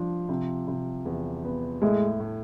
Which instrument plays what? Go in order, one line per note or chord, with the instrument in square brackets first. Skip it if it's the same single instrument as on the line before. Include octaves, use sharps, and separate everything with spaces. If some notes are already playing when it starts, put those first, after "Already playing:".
Already playing: [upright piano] F3 D4
C3
C3
E2
B3
[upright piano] A2 [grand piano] G#3
[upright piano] A2